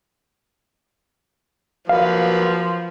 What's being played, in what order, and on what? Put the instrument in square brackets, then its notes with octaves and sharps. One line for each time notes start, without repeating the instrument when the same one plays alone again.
[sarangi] F3 [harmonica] F#3 A#3 B4 [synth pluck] F5